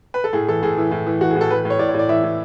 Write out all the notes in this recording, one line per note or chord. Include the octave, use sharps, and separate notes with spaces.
B4
A4
A2 G#4
E3 A4
A2 G#4
E3
A2
E3
E3 F#4
G#4
A2
A4
E3 B4
A2
C#5
A2 D5
C#5
A2 D5
E3 E5
A2